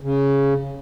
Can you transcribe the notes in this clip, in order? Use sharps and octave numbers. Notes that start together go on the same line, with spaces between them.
C#3